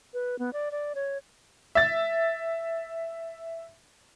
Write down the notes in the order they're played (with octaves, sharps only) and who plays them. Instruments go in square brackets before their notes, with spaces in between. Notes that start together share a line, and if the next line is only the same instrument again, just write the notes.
[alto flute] B4
B3
D5
D5
C#5
[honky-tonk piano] E5 A6